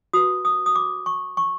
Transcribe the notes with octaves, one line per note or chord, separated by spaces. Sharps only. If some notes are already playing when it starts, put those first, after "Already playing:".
F#4 B4 D#6
D#6
D#6
D6
C#6
C#6